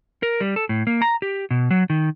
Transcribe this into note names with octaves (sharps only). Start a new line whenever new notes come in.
A#4
G3
A4
A2
A#3
A#5
G4
B2
F#3
D#3